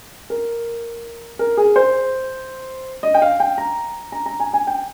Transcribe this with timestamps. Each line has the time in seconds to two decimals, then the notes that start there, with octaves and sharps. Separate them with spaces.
0.30 A#4
1.39 A#4
1.57 G#4
1.76 C5
3.03 D#5
3.14 G5
3.22 F5
3.40 G5
3.58 A#5
4.12 A#5
4.26 A#5
4.40 G#5
4.53 G#5
4.67 G5